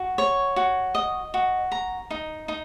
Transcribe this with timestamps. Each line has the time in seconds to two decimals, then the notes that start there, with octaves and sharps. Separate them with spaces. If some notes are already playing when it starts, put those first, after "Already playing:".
Already playing: F#4
0.18 C#5
0.56 F#4
0.95 D#5
1.34 F#4
1.72 A#5
2.11 D#4
2.48 D#4